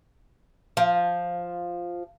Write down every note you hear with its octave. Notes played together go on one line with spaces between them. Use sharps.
F3